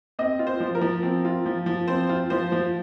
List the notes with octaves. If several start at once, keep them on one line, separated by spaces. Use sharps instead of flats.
C4 D#5
F4
C5
F3
A#4
F3
C4
F4
F3
F3
C4 C5
F4
F3 C5
F3